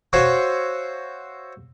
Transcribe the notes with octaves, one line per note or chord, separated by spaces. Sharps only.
F#4 C5 C#5 E5 F5 G#5